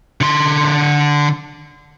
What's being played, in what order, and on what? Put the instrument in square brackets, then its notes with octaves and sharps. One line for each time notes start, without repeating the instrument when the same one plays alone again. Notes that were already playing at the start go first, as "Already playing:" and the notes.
[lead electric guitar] D3 C6